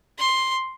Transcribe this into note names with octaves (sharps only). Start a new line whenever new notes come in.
C6